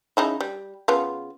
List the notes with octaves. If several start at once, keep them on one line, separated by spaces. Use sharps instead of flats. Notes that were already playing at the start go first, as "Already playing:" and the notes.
C#3 D#4 E4
G3
C#3 B3 F4